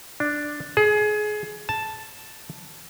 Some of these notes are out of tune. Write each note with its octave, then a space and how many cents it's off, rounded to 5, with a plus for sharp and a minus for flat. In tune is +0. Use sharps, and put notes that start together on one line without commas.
D4 +5
G#4 +25
A5 +0